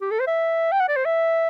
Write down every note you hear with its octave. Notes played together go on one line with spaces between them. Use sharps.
G4
A4
C5
E5
G5
F#5
D5
C5
E5